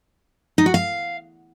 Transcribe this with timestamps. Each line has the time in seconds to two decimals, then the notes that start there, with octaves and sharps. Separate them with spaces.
0.58 D#4
0.66 F#4
0.74 F5